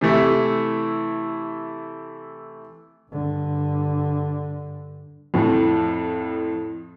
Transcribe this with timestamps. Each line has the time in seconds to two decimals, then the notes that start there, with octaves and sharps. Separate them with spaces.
0.01 C3 E3 A3 E4
3.11 G2 D3
5.34 F2 A2